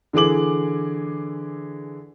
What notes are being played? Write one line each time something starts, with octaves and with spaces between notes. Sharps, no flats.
D3 E3 G#4 D6 F#7